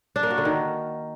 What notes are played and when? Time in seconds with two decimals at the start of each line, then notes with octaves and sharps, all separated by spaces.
0.16 D4
0.23 A#3
0.30 F#4
0.38 D3
0.45 D#3